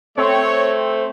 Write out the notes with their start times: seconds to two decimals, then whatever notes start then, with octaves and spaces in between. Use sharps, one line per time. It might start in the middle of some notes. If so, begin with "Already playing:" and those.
0.18 A3 C4 C#5